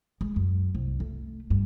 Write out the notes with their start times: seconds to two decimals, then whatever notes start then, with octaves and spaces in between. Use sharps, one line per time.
0.21 G#3
0.36 F#2
0.75 C2
1.00 A3
1.50 G2